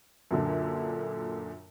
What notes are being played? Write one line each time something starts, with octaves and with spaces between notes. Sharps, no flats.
F#2 A#2 D3